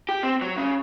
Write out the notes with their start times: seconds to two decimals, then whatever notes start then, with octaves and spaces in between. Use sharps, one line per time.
0.09 G4
0.23 C4
0.41 F#3
0.57 C#3